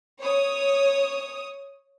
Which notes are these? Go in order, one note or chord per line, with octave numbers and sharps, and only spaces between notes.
C#5 D#6